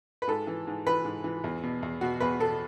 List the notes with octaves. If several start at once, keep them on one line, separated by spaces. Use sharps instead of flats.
B4
G#2 A4
E3
G#2
E3 B4
G#2
E3
E2
B2
E2
B2 F#4
E2 B4
B2 A4